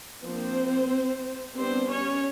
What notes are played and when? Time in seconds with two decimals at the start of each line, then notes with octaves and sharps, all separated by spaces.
0.23 F3 A#3 C4 D4 C5
1.56 G3 B3 C4 D4 C5
1.90 C#4 C#5